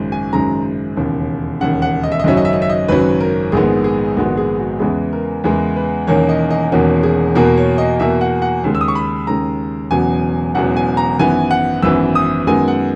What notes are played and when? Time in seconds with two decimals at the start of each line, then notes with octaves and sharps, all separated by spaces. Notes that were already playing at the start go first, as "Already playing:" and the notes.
Already playing: G#1 F#2 C#3 G#3
0.12 G#5
0.33 G#1 F#2 C#3 G#3 A#5
0.97 E1 D#2 C#3
1.60 E1 D#2 C#3 F#5
1.82 F#5
2.04 D#5
2.12 E5
2.20 D#5
2.24 G#1 F#2 C#3 F#3 C#4 E5
2.37 D#5
2.45 E5
2.53 D#5
2.62 E5
2.70 D#5
2.88 G#1 F#2 C#3 F#3 C#4 B4
3.21 A#4
3.52 A#1 G#2 D#3 G#3 B3 G#4
3.84 G#4
4.16 A#1 G#2 D#3 G#3 B3 F#4
4.37 G#4
4.59 F#4
4.80 E2 C#3 E3 G#3 B3 G#4
5.13 A#4
5.44 E2 C#3 E3 G#3 B3 A#4
5.76 B4
6.07 E1 E2 D#3 A#3 C#4 C#5
6.29 D#5
6.51 D#5
6.72 E1 E2 D#3 A#3 C#4 F#4
7.03 G#4
7.35 E2 B2 A#3 A#4
7.58 C#5
7.78 D#5
8.00 E2 B2 A#3 E5
8.21 F#5
8.42 F#5
8.64 D#2 C#3 G#3
8.75 E6
8.81 D#6
8.88 C#6
8.95 B5
9.27 D#2 C#3 G#3 A#5
9.91 E1 E2 C#3 F#3 B3 G#5
10.55 E1 E2 C#3 F#3 B3 F#5
10.76 G#5
10.97 A#5
11.19 G#1 F#2 E3 B3 G#5
11.51 F#5
11.82 G#1 F#2 E3 B3 E6
12.15 D#6
12.47 F#2 D#3 G#3 B3 G#5
12.68 F#5